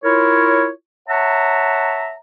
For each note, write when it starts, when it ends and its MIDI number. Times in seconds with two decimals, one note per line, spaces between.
0.04 0.70 64
0.04 0.70 65
0.04 0.70 70
0.04 0.70 73
1.08 2.15 73
1.08 2.15 76
1.08 2.15 78
1.08 2.15 81
1.08 2.15 82